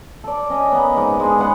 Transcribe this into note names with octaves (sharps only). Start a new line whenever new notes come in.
A4 D5
C#4 D#5
A#3 B3
G#2 D#4 D6
G#3 D4 G#4
B3 C#4 G#4 F#5